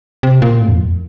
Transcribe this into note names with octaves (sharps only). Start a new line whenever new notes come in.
C3
A#2
A2
E2
F2